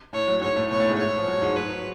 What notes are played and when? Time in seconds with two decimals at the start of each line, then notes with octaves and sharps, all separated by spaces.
0.13 A2 A3 C#5
0.28 F#3
0.41 G#2 G#3 C#5
0.56 A2 A3
0.70 B2 B3 C#5
0.80 A2 A3
0.89 G#2 G#3
0.99 C#5
1.17 F3
1.28 F#3
1.42 G#2 G#3
1.57 F#3 B4